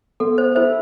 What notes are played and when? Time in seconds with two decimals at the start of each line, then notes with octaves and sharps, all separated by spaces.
0.20 B3 A4
0.38 C5
0.55 E4 A4 C5 E5